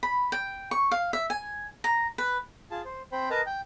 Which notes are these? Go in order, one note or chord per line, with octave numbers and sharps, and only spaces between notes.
B5
G5
C#6
F5
E5
G#5
A#5
B4
F4 G#4 A5
C5
C4 C5 G5 B5
A#4 B4 D#5 A5 A#5
G5